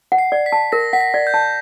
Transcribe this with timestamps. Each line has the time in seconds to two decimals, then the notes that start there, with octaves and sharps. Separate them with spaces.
0.12 F#5
0.18 C7
0.32 D5
0.46 B6
0.52 A5
0.72 A#4 A#6
0.93 F#5 B6
1.01 A#6
1.14 D5
1.27 G6
1.34 A5